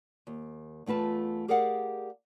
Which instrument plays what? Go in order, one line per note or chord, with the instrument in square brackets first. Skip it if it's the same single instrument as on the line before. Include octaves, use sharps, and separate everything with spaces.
[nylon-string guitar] D#2
E2 A3 F4 B4 A5
G4 G#4 A#4 D5 F5 F#5